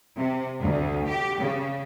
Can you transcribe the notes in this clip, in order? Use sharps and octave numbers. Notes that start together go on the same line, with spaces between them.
C3
D2
G4
C#3